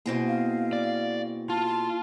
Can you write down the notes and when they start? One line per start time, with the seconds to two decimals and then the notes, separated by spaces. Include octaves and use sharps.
0.06 B2 A#3 C4 E4 G#4 A#6
0.28 F5
0.73 D5
1.50 F4 A5